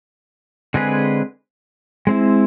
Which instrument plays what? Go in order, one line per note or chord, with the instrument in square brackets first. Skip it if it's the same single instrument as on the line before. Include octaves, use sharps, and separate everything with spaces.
[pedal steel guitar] D3 G#3 C4 G#4 B4
G#3 C4 E4